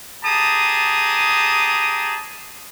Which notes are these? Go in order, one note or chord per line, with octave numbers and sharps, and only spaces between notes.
G4 G#4 A5 A#5 D#6